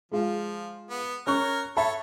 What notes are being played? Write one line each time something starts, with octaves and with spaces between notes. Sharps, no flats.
F3 G#3 F4
B3
C#4 A#4 C#5 C#6 F#6
A4 C#5 E5 A5 B5